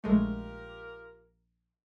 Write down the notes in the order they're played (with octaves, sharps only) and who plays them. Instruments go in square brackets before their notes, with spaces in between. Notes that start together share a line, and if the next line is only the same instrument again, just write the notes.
[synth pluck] A#1 G#3 A3 [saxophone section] F4 G4 A#4